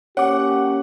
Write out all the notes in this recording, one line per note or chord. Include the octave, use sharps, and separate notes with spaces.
A#3 C#4 G4 C#5 F#5 D6